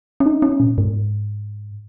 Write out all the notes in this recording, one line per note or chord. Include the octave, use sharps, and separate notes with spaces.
C#4
D#4
C#4
A#2
G#2